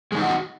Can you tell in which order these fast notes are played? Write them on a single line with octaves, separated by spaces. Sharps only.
G#3 D#3 D#4 F#4